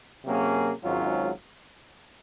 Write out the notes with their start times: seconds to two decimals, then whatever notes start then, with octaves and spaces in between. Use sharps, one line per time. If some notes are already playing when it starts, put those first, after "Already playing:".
0.25 C3 F#3 A#3 C#4 G#4
0.83 G#1 G#2 F#3 C#4 F4